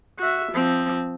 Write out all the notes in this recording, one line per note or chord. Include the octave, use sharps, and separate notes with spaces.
F#4 E5
F3 C4